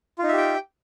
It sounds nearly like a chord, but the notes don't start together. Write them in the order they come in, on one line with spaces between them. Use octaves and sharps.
F4 D#4 E5 G4 G5